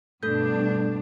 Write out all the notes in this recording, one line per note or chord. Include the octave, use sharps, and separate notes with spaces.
G2 B2 A3 D4 A4 G6